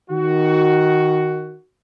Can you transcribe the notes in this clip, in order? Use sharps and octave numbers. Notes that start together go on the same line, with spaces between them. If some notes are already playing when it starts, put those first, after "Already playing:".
D#3 F#4